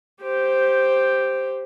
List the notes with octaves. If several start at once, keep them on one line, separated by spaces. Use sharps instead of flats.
G4 C5